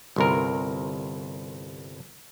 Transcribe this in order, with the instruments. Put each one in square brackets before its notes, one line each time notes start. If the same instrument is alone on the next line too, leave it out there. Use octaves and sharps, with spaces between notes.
[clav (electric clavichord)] G1 C2 A#4